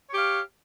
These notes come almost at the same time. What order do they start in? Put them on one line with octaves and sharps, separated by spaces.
C#5 G4 F5